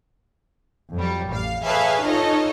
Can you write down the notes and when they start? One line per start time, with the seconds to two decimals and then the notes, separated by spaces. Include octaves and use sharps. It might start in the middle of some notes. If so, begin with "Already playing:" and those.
0.95 F2 F#3 G3
1.30 A1 F5
1.65 G#4 A4 B4 C#5 E5 F5
2.05 D#4 F4 A4 C#5 D#5